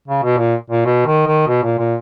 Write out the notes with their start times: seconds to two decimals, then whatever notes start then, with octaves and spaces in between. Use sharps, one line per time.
0.08 C#3
0.23 B2
0.38 A#2
0.70 A#2
0.86 B2
1.06 D#3
1.27 D#3
1.48 B2
1.64 A#2
1.79 A#2